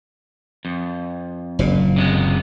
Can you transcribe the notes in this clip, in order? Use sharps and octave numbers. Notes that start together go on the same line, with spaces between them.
F2
F#1 A#2
C3 G#3 B3